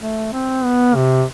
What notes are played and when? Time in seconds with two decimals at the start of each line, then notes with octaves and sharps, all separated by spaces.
0.01 A3
0.33 C4
0.64 B3
0.95 C3